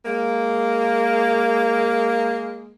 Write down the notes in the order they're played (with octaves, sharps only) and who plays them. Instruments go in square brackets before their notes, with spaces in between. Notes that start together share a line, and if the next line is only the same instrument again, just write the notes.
[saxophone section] G#3 A#3